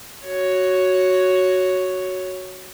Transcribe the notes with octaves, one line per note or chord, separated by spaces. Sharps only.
F#4 C#5